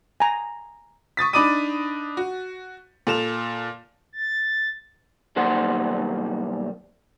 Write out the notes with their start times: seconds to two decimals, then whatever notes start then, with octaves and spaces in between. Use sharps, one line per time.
0.20 G#5 A#5
1.17 C#6 D#6 A6 B6
1.33 D4 D#4 B5 D6 D#6 D#7
2.17 F#4
3.07 A#2 A4 E7 F7
4.13 A6
5.36 B1 D#3 G3 A#3 C5 F#5